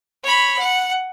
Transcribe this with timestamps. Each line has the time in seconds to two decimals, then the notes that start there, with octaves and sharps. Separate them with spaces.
0.24 C#5 B5
0.58 F#5